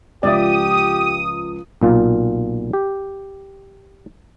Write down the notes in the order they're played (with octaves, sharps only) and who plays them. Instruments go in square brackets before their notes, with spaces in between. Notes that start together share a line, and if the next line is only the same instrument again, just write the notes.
[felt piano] C#2 F3 [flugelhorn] G4 [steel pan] D5 E5 [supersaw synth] D#6
[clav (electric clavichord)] B1 A#2 F4
G4